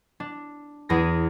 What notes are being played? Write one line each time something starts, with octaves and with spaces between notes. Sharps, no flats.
D4
E2 G#4 A#6